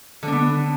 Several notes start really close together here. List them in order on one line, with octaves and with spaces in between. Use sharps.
D3 D4 B3